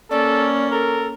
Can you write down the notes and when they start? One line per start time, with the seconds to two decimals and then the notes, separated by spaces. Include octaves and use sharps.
0.11 A#3 C#4 A4 D5
0.72 A4 A#4